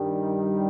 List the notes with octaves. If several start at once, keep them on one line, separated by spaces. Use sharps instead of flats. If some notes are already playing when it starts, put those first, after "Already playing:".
Already playing: G2 D#3 G3